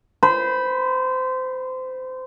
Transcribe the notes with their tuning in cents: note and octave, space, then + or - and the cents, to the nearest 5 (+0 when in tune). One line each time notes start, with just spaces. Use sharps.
C5 -25 B5 +0